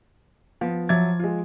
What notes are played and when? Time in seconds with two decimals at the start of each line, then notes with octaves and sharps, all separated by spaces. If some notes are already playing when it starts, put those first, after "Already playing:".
0.61 F3 B3
0.89 F3 F#3 E5 D6 G#6 A6
1.19 G#3 F4